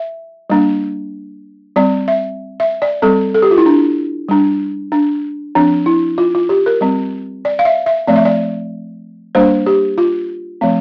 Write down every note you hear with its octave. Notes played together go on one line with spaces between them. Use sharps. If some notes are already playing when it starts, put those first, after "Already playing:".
Already playing: E5
G3 A#3 D4
G3 C4 D5
E5
E5
D5
G3 C4 A4
A4
G4
F4
E4
D4
G3 D4
D4
F3 C4 D4
E4
F4
F4
G4
A#4
G3 C4
D5
F5
E5
E5
F3 A3 C4 D5
E5
D5
G3 A#3 D4 C5
G4
F4
F3 A3 C4